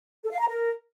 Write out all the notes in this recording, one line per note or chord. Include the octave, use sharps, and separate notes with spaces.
A4
F5
A#5
A#4